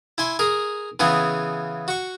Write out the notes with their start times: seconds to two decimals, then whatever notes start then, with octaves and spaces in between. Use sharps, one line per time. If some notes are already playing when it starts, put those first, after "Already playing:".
0.18 E4 G#5 C6
0.39 G#4 A#4
1.00 C#3 E3 B3 G#4
1.88 F#4 C#6